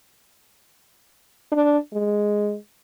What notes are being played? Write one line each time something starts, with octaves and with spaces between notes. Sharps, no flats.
D4
G#3